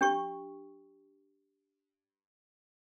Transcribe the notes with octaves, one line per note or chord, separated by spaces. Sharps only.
D4 G4 C#6